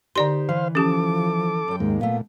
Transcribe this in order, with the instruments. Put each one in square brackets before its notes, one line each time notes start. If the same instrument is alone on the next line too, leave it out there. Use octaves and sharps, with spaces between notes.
[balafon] D3 D5 C6 [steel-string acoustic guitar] D#4 G4 C5
[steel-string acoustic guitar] E3 [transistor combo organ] C5 F5
[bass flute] F3 [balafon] C#4 G4 [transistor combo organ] A4 D6
[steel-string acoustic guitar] F#2 G5
[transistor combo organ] D#2 G#2 A#3 [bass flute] G#3
[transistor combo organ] A#2 [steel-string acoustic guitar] A3 B3 [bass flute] F5